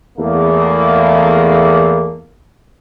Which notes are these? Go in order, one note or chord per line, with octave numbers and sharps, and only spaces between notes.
E2 A3 A#3